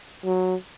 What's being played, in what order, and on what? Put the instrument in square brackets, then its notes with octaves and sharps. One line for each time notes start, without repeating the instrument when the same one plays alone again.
[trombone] F#3